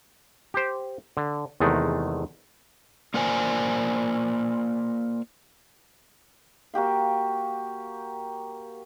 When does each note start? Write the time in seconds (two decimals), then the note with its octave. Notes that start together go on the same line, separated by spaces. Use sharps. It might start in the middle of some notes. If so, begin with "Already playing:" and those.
0.54 G4 C5
1.17 D3
1.60 E2 C3 D#3 G#3 A3
3.14 A#3 F4 A#4 C5 D5 G#5
6.74 A#3 F#4 G4 F5